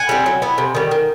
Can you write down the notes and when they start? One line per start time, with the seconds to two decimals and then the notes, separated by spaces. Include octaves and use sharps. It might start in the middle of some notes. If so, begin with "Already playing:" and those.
Already playing: F#5 G#5
0.09 G3 C4
0.26 F#3
0.42 B3 E4
0.58 C3
0.75 D#3 G3
0.91 D#3